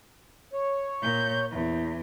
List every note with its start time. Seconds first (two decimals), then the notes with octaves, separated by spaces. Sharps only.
0.53 C#5
1.01 A#2 G6
1.50 E2